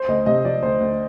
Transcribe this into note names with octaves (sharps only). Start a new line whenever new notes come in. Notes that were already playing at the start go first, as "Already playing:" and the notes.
Already playing: C5
D2 D#5
C3 D#5
F3 D5
D2 C5
D2